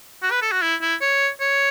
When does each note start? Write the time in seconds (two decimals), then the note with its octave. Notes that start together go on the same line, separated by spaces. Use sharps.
0.22 F#4
0.31 B4
0.42 A4
0.52 F#4
0.62 E4
0.81 E4
1.01 C#5
1.40 C#5